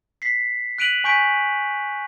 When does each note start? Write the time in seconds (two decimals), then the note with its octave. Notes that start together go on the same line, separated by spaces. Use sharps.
0.22 B6 C7
0.78 F#6 B6 D7 D#7 F7 F#7
1.04 G#5 C#6 G6 B6 D7